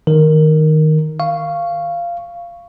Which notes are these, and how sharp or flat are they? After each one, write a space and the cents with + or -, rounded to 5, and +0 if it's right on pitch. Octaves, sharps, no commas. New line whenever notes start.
D#3 +0 A#4 +0
F5 -15 C#6 +0